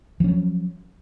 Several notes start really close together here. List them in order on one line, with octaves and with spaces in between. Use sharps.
F3 C#4 F#3